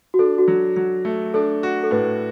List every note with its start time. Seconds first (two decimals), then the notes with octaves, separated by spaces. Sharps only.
0.14 F#4
0.19 D4 A4
0.38 F#4
0.48 F#3
0.76 F#3
1.05 A3
1.34 D4 A4
1.63 F#4
1.83 A4
1.91 A2 B4